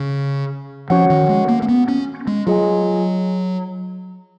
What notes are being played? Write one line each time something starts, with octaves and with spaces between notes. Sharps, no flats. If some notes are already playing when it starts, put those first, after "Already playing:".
Already playing: C#3
F3 C#4 F#4 C#5 F#5
D#3
G#3
A#3
A#3
B3
C#4
G#3
F#3 F4 G#4 D#5 G#5